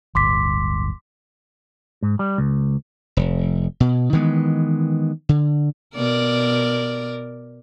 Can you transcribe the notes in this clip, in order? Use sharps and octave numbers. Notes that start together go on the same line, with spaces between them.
D1 G1 C6 D6 B6
G#2
G3
C#2
F1
B2
D#3 E3 G#3 B3
D3
B2 A#4 D5